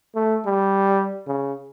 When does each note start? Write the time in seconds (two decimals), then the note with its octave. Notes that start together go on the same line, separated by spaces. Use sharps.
0.15 A3
0.46 G3
1.27 C#3